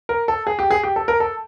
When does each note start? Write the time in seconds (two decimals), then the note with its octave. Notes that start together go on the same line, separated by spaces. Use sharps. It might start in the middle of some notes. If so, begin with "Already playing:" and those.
0.09 A#4
0.28 A4
0.47 G#4
0.59 G4
0.71 G#4
0.83 G4
0.96 A4
1.08 A#4
1.20 A4